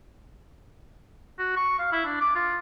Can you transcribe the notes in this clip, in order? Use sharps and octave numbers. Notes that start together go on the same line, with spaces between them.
F#4
C#6
F5
E4
D4
D6
F4